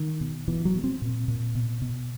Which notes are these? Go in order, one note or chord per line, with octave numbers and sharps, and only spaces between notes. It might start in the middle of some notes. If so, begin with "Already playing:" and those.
Already playing: D#3
B2
B2 E3
F#3
B2
C4
A#2
A#2
B2
B2